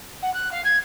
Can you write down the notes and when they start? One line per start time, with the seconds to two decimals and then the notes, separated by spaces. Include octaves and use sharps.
0.22 F#5
0.33 F#6
0.51 F5
0.64 G#6